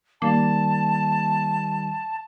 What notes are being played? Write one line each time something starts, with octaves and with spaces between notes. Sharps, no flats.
D#3 G3 A#3 A5